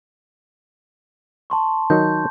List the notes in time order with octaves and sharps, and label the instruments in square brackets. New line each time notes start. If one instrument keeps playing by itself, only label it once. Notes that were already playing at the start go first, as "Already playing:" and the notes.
[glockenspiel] A5 C6 C#6
[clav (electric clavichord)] D#3 F#3 D#4 [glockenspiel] G6